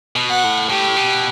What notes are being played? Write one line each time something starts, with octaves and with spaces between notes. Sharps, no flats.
B2
F#5
A2
A2 G4
B2